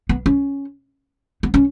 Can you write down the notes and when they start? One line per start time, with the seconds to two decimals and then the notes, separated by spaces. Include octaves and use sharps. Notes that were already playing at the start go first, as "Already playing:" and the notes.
0.09 B3
0.26 C#4
1.43 B3
1.54 C#4